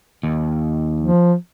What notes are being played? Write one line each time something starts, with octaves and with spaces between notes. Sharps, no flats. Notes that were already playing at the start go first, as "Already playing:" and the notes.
D#2
F3